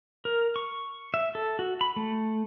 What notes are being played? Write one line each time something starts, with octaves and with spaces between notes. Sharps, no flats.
A#4
C#6
E5
A4
F#4
B5
A3